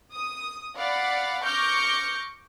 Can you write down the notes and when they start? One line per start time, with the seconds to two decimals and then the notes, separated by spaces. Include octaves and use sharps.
0.14 D#6
0.76 D5 F5 F#5 B5
1.44 C#6 D6 F6 G6 A#6 C#7